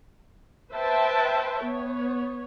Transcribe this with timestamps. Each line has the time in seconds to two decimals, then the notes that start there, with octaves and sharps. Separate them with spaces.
0.71 B4 C5 E5 G5 A5
1.63 B3 C#5